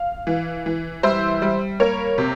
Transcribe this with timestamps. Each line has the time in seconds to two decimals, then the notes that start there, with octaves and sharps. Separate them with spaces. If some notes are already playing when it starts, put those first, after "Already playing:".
Already playing: F5
0.27 E3
0.66 E3
1.03 G3 C5 E5
1.42 G3
1.80 A#3 A#4 C#5
2.18 C3